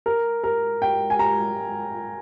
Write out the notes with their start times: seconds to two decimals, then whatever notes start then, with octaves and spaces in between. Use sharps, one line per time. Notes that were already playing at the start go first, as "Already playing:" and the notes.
0.06 A#4
0.44 A#4
0.82 G5
1.10 G#5
1.19 A#5